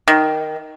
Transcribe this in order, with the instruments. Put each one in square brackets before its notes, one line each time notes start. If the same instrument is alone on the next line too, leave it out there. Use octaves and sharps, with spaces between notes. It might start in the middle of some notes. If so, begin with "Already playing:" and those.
[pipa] D#3